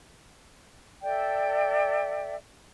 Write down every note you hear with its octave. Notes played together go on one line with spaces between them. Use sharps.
A4 D5 E5 G5